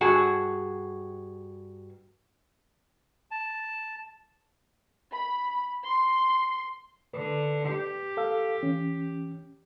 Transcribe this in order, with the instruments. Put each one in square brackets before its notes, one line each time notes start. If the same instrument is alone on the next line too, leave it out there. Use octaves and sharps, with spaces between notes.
[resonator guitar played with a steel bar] G2 F#4 G#4 A5
[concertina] A5
[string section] B5
C6
[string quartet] D3 [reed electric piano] B4
[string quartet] G4
[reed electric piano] A4 F5 E6
E3 C#4